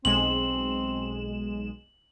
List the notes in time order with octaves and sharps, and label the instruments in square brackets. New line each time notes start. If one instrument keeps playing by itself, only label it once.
[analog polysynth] B1 G#3 E7 [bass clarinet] C4 [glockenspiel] F#7